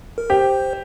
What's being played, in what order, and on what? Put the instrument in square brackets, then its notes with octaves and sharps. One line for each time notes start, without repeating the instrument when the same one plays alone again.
[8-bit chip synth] A#4
[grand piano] G4 [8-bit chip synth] C5